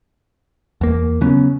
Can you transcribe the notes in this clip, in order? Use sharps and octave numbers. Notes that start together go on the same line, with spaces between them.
E2 A#3
C#3 F#3 B3 C#4